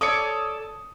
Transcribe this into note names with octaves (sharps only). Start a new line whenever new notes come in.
A4 C#5 D5 D#6 C#7